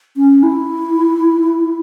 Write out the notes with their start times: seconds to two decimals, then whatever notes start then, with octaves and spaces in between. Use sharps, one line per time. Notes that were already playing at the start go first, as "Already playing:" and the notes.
0.17 C#4
0.43 E4